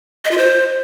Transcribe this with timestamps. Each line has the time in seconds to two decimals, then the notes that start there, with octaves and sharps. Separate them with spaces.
0.25 D#5
0.31 F4
0.38 C5